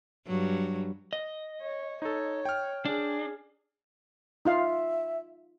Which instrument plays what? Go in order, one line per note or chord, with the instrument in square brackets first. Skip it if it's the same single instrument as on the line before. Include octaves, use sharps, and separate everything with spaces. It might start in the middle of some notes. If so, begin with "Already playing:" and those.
[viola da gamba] G2 F#3
[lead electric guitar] D#5
[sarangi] C#5
[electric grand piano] D#4 A4 [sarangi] C#5
[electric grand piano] G5 F6
[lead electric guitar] D4 [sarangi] G#4
[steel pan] D#4 F4 F5 [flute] E5